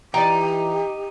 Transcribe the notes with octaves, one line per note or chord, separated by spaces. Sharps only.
E3 D#4 G4 D5 G5